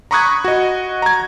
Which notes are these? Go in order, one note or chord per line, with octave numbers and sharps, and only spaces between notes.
A#5 B5 C#6 D#6 F#6 G#6
F#4 D#5
A#5 G#6